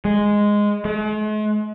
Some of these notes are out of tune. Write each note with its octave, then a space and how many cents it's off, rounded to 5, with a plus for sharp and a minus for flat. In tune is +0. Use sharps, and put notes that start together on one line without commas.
G#3 -5
G#3 +45